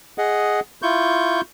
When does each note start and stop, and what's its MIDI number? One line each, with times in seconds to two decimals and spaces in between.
0.18 0.60 68
0.18 0.60 75
0.18 0.60 78
0.82 1.41 64
0.82 1.41 65
0.82 1.41 85
0.82 1.41 91